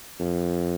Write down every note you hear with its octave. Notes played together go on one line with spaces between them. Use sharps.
F2